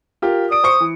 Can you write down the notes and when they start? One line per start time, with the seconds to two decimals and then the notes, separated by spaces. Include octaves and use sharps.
0.22 F4 G4 A#4
0.51 D5 D#6 D7
0.64 C5 C#6 C#7
0.80 E3